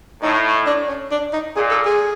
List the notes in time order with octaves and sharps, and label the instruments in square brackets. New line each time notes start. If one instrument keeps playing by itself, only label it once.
[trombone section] A2 [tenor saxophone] D#4
[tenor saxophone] D4
C#4
D4
D#4
[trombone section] A#2 [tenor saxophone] G#4
[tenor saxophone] A4
G#4